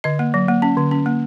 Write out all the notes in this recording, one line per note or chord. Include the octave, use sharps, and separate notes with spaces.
D3 D#5
A#3
F#3
A#3
C#4
D3
C#4
A#3